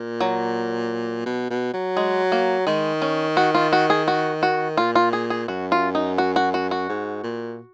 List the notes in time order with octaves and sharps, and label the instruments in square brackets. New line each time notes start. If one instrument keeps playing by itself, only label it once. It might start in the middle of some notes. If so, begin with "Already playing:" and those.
Already playing: [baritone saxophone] A#2
[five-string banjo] F#3
[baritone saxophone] B2
B2
F#3
[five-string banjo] G#3
A#3
[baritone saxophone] D#3 [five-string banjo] G#3
[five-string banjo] C#4
F#4
F4
F#4
G#4
F#4
F#4
[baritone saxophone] A#2 [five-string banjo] F4
[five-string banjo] F4
G#4
G#4
[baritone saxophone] F#2 [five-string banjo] F#4
[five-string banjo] F4
D#4
F#4
F#4
F#4
F#4
[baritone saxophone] G#2
A#2